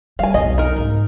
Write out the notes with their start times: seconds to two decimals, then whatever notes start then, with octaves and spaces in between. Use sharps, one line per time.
0.19 G3 F5 G#5
0.34 B1 F2 D#5
0.58 D#4 A#4
0.76 G#2